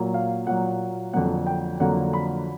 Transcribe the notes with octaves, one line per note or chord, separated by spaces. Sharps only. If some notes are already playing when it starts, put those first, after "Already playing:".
Already playing: A#2 F#3 A#3
F5
A#2 F#3 A#3 F#5
F2 D3 F#3 A#3 F#5
G5
F2 D3 F#3 A#3 F#5
B5